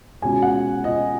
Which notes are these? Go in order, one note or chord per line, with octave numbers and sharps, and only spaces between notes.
B2 G#3 C#4 G#5
F#5
D#5